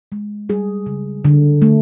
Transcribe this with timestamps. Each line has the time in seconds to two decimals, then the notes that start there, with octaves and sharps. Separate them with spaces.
0.12 G#3
0.49 G3 G#4
0.86 C#3
1.25 D3
1.62 A3